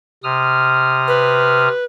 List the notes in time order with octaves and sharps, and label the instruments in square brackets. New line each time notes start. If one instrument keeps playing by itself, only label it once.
[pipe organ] C3 D#6 F6
[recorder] B4